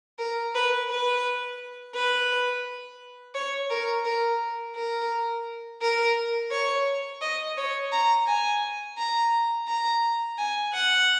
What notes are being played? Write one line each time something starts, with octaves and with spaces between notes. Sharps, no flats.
A#4
B4
B4
B4
C#5
A#4
A#4
A#4
A#4
C#5
D#5
C#5
A#5
G#5
A#5
A#5
G#5
F#5